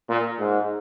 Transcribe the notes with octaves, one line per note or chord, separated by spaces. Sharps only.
A#2
G#2